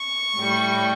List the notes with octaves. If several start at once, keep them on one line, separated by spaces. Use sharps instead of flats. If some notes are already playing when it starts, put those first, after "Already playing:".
Already playing: C#6
A2 G3